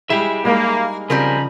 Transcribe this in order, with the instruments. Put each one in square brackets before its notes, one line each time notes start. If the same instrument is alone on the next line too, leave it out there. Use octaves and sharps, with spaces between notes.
[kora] G3 G#3 E4 [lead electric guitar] G4 E5 [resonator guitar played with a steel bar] G#4
[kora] G3 G#3 D#4 [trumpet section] A#3
[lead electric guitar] C#3 [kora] F3 [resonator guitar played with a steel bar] G3 C4 A#4 [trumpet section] G#4 A#5 B5